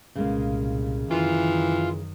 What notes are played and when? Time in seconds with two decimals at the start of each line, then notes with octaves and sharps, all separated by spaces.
0.15 C2 A#2 C#3 G#3 A#3
1.11 F#2 D#3 E3 F4